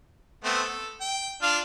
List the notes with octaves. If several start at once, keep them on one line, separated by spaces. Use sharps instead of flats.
A3 B3 C4
A4
G5
D4 F4 F5